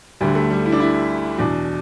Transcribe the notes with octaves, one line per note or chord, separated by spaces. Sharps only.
D2 D3 G3
A3
G3
E4
D4
E4
E2 B2 D4